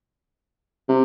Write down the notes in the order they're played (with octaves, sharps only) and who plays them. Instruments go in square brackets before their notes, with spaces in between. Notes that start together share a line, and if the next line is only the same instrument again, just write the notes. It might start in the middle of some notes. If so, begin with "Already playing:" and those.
[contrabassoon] C3